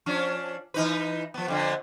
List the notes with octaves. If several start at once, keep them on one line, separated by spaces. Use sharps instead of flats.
F3 C#4 D4
E3 D#4 B4
F3 B3
F2 D3 B3